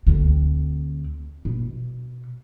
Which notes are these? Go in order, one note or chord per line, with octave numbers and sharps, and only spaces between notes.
D2 C4
B2